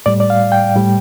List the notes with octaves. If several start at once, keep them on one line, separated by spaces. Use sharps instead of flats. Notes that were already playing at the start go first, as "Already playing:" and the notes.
A2 G3 D5
D5
F5
G5
A2 G3